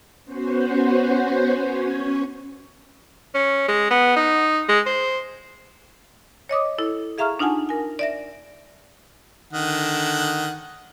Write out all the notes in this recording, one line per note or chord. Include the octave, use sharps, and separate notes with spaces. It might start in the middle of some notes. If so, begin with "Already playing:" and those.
B3 C#4 F#4 C5
C#4 C#5
C#4
G#3
B3
D#4
G#3
C5
C#5 D#5 D6 D#6
E4 A4
G#4 E5 F5 A#5 C#6 F6
D4 D#4 F4 F#5 G#5 A5
A#4 G#5
D5 E5 A#6
D3 D#3 F#5